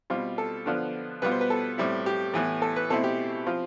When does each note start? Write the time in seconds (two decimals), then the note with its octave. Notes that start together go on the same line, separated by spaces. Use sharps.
0.10 B2 G3 C4 F4
0.38 A4
0.66 D3 F3 B3 D4 F4
1.22 B2 G3 B3 F4 B4
1.31 C5
1.41 B4
1.50 A4
1.78 A2 G3 C4 E4
2.06 G4
2.34 A2 E3 B3 E4
2.62 A4
2.76 B4
2.90 B2 A3 C4 E4 A4
3.04 G4
3.47 F3 C4 F4